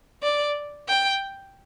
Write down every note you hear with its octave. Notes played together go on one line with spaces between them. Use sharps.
D5
G5